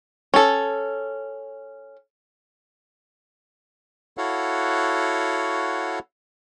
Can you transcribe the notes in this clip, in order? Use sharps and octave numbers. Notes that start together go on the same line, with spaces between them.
C#4 A4
E4 F#4 A4 C#5 F5 F#5